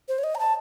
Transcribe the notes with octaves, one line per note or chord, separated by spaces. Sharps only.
C5
C#5
D#5
A#5
A5